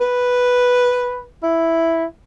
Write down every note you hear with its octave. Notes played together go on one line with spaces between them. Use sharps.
B4
E4